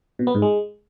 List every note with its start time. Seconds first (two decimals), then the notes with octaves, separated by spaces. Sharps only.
0.19 B2
0.27 B3
0.35 G#2
0.42 G#3